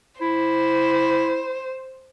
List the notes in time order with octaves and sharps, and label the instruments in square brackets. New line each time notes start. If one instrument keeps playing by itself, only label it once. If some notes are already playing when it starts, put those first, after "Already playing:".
[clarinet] E4 [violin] C5